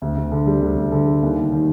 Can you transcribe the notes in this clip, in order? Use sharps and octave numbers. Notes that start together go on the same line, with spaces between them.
D2
D2
D3
G3
D2
D2
D3
G3
D#2
D#2
D#3